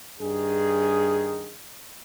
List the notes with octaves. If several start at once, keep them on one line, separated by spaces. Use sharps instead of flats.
G2 D#3 G#4